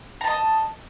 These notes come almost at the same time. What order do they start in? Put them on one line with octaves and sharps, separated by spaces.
A#5 A5 D#5